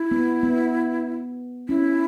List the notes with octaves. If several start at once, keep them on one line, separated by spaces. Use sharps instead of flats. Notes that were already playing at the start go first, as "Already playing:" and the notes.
Already playing: E4
B3
B3
C#4 E4